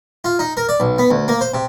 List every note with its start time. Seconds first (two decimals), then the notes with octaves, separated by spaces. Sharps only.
0.24 F4
0.39 D#4
0.57 A#4
0.69 D5
0.80 B1
0.98 B3
1.11 D2
1.28 A#3
1.41 C5
1.54 C3